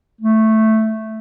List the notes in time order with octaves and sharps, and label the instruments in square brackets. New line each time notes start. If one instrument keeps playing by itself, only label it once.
[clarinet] A3